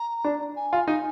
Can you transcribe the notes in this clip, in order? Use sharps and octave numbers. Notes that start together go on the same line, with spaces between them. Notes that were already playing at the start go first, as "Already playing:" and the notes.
Already playing: A#5
D4
G#5
F4
D#4 G#5